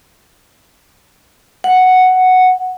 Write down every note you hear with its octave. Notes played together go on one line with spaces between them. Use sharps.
F#5